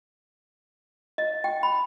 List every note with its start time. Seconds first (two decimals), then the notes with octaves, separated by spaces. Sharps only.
1.18 D#5
1.44 G5
1.63 B5